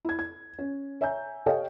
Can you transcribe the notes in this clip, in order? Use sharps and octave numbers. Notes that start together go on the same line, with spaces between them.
E4 G#6
G#6
C#4
C#5 E5 G#5 A#5 G6
G4 A4 C#5 D#5 F5 G5